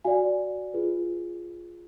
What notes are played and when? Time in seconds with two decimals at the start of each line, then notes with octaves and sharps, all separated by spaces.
0.05 F#4 D5 F5 G#5
0.74 F4 G#4 B4